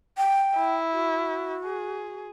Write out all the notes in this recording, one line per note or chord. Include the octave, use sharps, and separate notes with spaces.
G5
E4
F#4
G#4